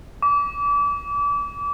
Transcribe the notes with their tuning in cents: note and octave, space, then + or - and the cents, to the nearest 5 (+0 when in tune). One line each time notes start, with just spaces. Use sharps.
D6 -35